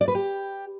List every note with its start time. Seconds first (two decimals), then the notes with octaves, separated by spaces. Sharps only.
0.01 D5
0.08 B4
0.15 G4